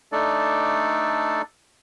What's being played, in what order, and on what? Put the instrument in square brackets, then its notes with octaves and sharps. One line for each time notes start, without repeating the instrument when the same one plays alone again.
[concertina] A3 D4 D#4 A4 D5